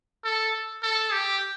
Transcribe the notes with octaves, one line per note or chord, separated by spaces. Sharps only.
A4
A4
G4